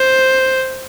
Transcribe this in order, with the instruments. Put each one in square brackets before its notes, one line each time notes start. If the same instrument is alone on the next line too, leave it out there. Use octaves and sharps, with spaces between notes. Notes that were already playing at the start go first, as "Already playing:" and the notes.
Already playing: [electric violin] C5